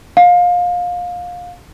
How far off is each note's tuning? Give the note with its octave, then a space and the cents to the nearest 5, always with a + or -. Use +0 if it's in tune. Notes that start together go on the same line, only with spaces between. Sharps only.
F5 +25